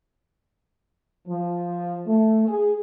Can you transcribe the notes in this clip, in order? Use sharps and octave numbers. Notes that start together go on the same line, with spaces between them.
F3
A3
G#4